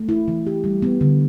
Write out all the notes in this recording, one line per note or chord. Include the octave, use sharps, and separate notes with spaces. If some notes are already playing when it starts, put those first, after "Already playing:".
Already playing: A3
E4
E3
G4
G3
B3
D3